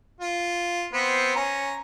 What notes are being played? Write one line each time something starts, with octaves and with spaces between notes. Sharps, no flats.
F4
B3 C4 C5
C#4 A#5